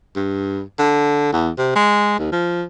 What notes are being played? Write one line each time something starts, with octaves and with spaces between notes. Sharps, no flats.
G2
D3
E2
C3
G#3
D#2
F3